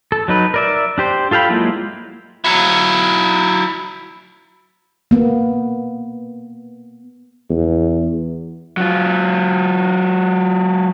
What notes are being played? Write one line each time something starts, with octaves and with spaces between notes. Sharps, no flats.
A4
F#3 D#4 B4
A#4 D5 E5
D4 G4 C5
F4 A4 F5 G5 B5
F#3 G#3 A#3 E4 F4
F#3 E4
A#3 B3
E2
F#3 F4